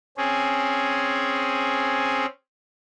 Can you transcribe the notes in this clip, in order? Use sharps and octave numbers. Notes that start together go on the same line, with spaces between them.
C4 C#4 G#4